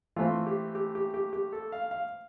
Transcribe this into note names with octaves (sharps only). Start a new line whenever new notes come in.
E3 A3 C4 F4
G4
G4
G4
G4
G4
A4
F5
F5